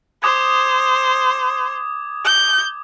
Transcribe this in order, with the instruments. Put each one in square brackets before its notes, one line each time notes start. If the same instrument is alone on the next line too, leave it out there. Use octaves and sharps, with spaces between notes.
[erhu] C5 [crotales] D6 D#6 G#6
[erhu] G6